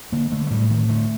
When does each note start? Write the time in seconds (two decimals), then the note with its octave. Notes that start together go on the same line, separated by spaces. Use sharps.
0.12 D3 A#3
0.32 D3 A3
0.47 A3
0.51 A2 G3
0.70 A2 D#3
0.89 D3 A3